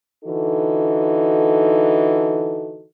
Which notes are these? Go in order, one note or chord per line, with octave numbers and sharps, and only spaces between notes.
D3 E3 D#4 F#4 A4